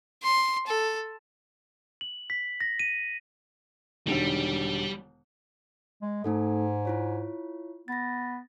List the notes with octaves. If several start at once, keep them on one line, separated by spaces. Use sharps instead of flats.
C6
A4
F#7
B6
A#6
D#7
E1 D3 D#3 G3
G#3
G#2 A3 D#4 A4
E4 F4 C#5
B3 A6 A#6